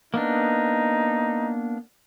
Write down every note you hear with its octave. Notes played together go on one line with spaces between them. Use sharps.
A#3 B3 D4 D#4